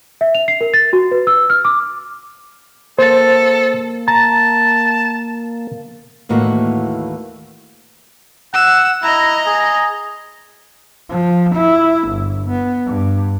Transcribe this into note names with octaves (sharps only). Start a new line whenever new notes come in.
E5
F7
C7
A#4
A6
F#4
B4
E6
F6
D6
A#3 A4 C5 A6
A5 A#5 A6
D#2 A2 E3 A#3 F#4
F#5 E6
E4 D#5 A#5
G#4
F3
E4
G1
B3
G2